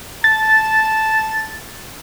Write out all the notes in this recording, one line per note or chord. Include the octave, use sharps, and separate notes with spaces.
A5 A6